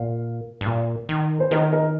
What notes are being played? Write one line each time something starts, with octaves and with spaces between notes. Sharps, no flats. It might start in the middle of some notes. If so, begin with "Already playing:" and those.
Already playing: A#2 F5
G2
A#2
D#3
C5
D#3 A#4 D#5
A#4 D#5